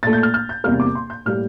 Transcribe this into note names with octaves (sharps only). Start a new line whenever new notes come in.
A#2 A3 A6
G6
F6
F6
G6
E2 C3 G3 A#3 F6
D6
C6
G6
A2 G3 A#3 F6